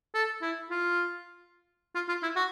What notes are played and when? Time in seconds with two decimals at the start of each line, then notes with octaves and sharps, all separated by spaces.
0.14 A4
0.42 E4
0.70 F4
1.95 F4
2.08 F4
2.23 E4
2.36 F#4